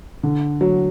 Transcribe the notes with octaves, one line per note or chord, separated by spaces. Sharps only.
D3
F#3